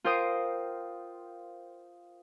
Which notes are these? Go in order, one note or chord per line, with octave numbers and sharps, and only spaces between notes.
F4 A#4 C5 G5 D#6